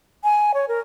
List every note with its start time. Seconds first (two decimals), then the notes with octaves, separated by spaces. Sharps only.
0.24 G#5
0.54 C#5
0.68 A#4